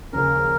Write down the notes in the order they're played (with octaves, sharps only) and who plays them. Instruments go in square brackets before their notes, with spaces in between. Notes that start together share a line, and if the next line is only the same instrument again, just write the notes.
[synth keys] D#2 C#3 F3 C#4 [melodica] A#4